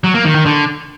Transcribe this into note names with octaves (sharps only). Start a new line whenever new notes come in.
F#3
A#3
D#3
D#3
D3